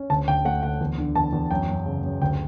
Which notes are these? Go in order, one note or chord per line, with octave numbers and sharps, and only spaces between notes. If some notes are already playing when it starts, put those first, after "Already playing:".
Already playing: C#4
D2 A5
D2 G5
A3 F#5
D2 F#5
E2
D3
E2 A5
E2
F#2 G5
F#2
C#3
F#2
D2 G5